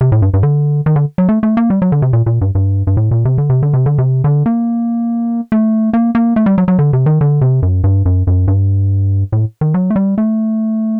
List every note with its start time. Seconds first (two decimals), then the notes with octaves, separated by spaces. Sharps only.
0.01 C3
0.12 A2
0.22 G2
0.34 G2
0.43 D3
0.86 D#3
0.96 D3
1.18 F#3
1.29 A3
1.43 A3
1.57 A#3
1.70 G3
1.82 F#3
1.92 D3
2.02 C3
2.13 A#2
2.26 A#2
2.41 G2
2.55 G2
2.87 G2
2.97 A2
3.11 A#2
3.25 C3
3.38 D3
3.50 C3
3.63 D3
3.73 C3
3.86 D3
3.98 C3
4.24 D3
4.46 A#3
5.52 A3
5.93 A#3
6.15 A#3
6.36 A3
6.46 G3
6.58 F#3
6.68 F#3
6.79 D3
6.93 C3
7.06 D#3
7.21 D3
7.41 C3
7.62 F#2
7.84 G2
8.05 F#2
8.27 F#2
8.48 G2
9.32 A2
9.61 D#3
9.74 F#3
9.90 A3
9.96 G3
10.18 A3